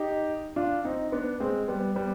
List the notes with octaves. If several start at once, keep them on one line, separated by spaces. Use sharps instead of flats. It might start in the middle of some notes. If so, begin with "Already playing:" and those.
Already playing: D#4 G4
D4 F4
C4 D#4
B3 D4
G#3 C4
G3 B3
G3 B3